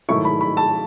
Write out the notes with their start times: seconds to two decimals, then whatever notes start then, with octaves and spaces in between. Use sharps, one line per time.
0.09 G#2 D#3 F#3 A3 E4 C#6
0.25 B5
0.41 B5
0.57 A5